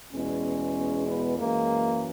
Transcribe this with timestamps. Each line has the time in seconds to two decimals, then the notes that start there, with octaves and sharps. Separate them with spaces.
0.13 E2 B2 G#3 C#4
1.07 B3
1.38 F#2 E3 G#3 A#3